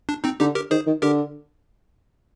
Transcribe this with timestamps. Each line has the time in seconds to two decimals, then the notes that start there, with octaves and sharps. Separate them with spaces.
0.09 D4
0.24 C4 D#4
0.40 D3 D#4 G4
0.55 G4 A#4
0.71 D#3 G#4 C5
0.86 D#3
1.02 D3 G4 A#4